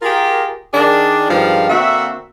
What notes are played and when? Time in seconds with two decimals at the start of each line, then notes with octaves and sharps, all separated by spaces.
0.02 F4 G4 G#4 A#4
0.74 D#3 D4 G#4
1.29 G2 D#3 F3 G#3 D4 F5
1.69 D3 A#3 C4 F#4 E5